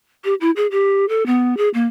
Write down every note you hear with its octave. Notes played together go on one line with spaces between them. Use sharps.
G4
E4
G#4
G4
A4
B3
G#4
A#3